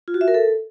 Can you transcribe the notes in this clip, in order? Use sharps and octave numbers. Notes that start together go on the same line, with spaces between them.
F4
F#4
E5
A#4
A4